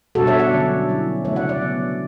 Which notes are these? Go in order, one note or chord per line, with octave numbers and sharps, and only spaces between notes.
B2 G3 D4 F#4 A4
C#5 E5
D5 F#5
D3 F#3 C#4
F#3 C#4 E4
C#3 E3 A3 C#5 E5
D5 F#5
D5 F#5
F#3 B3 D4